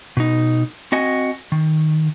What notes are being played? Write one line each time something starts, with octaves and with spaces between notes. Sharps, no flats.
B2 D#4
C4 F#4 D#5 F#5 G#5
D#3